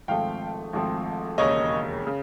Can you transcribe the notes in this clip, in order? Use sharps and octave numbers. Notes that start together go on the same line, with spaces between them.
G#1 G#2 F3 A3 C4 F5 G5
G#1 G#2 F3 A3 C4
E1 D#2 C#3 C#5 D#5
C#3